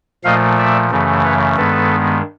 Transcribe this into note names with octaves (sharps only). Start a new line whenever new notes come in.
A#2 F3 A3 D#5 F5
D5 E5
F#2 C#3 E3 A3
B4 C#5
G2 D#3 G#3 B3 A4 B4